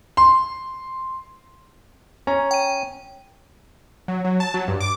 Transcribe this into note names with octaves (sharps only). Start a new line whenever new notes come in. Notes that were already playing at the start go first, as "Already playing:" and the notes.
C6
C#4 A#5
G5 D#7
F#3
F#3
A5
F#3
G2
D6